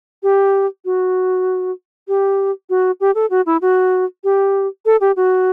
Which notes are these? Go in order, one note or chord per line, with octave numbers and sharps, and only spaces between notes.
G4
F#4
G4
F#4
G4
A4
F#4
E4
F#4
G4
A4
G4
F#4